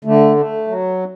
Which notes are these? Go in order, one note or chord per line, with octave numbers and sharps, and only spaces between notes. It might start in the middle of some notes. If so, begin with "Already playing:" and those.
D3 A3
A3
F#3